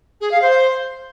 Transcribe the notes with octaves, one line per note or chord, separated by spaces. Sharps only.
G#4
F5
C5